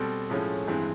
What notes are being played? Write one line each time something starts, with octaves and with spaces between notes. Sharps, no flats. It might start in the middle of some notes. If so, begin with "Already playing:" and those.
Already playing: B2 G3 C4 A4
A2 F3 G#3 C#4
G2 E3 G#3 C4